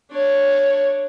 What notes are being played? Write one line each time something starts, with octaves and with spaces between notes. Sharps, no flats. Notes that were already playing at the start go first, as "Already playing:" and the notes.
D4 C#5